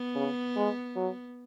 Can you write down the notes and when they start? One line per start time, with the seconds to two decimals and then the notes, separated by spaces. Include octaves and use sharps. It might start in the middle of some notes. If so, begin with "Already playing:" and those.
Already playing: B3
0.15 C#3
0.56 G#3
0.96 F#3